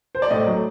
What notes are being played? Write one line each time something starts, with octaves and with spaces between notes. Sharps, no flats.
C5
D5
A2 D#5
F#3 A3